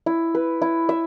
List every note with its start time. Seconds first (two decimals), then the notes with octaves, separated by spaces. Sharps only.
0.06 E4
0.35 B4
0.62 E4
0.89 E5